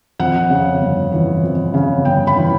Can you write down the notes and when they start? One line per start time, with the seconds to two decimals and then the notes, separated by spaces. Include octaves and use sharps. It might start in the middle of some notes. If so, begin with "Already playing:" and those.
0.20 F2 F#5
0.50 C#3
0.81 G1
1.12 E3
1.43 F2
1.74 C#3
2.04 G1 G5
2.27 B5
2.36 E3